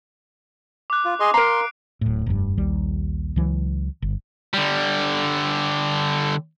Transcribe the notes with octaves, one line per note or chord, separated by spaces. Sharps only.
D6 F#6
F4
G#4 D#5 C6
A#4 F5 A#5 C6 C7 D7
D1 A2
F1 G2
A#1 D#2 G3
C#2 E3 F#3
G1
D3 G3